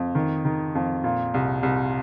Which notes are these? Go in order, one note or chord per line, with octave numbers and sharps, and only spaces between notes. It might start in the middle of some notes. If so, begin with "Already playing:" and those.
Already playing: F2
D#3
D#3
F2
A#2
C2
C2